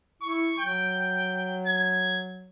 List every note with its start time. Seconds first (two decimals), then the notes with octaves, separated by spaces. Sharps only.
0.22 E4 C#6
0.59 F#3 G5
1.67 G#6